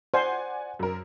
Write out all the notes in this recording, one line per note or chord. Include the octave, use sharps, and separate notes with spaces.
C5 D5 F#5 G#5
F#2 A#4